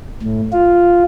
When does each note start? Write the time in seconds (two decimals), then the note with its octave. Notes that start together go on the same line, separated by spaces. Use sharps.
0.23 A2
0.53 F4